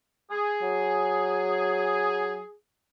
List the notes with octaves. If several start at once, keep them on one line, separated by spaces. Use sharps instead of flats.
G#4
F#3